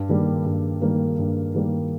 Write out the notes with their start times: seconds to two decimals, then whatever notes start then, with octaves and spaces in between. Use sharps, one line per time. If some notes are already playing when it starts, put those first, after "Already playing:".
Already playing: G2
0.09 D#3 G3 A#3
0.46 G2
0.81 D#3 G3 A#3
1.19 G2
1.55 D#3 G3 A#3